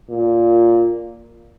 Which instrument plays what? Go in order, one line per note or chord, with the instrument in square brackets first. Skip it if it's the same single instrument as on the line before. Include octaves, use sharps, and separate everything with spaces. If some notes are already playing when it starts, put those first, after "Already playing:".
[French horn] A#2